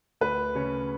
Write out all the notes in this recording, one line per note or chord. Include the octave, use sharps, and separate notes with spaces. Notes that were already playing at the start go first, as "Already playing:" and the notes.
D2 B4
C#3 C#5